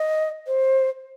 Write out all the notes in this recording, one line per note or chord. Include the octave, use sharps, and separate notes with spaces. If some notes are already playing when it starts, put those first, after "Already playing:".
Already playing: D#5
C5